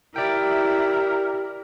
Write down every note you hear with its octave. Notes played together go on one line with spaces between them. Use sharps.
E4 G4 A#4 D5 G5